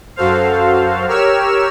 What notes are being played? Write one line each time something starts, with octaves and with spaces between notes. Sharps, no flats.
F#2 F#4 A4 C5 F5
G4 A#4 C#5 E6 F6 E7